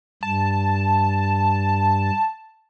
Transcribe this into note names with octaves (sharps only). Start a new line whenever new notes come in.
G2 A5